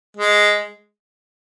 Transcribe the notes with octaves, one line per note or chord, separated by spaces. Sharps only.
G#3